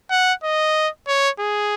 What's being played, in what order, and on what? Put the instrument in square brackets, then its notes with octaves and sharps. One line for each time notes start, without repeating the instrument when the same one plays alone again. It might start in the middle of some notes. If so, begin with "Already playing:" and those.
[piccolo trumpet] F#5
D#5
C#5
G#4